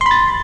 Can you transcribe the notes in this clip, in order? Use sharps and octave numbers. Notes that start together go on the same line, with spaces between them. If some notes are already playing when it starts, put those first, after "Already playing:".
B5 C6 A6